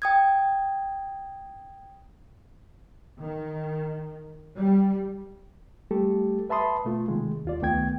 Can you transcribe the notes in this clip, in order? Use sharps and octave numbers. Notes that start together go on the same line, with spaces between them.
G5 D#6 G#6
D#3
G3
G3 A3 G4 A4
B4 E5 A5 B5 C6 D#6
B2 A3 F4
C3 D#3 G#3
D#2 F4 D5
C#2 D#3 A3 B3 G5 G#6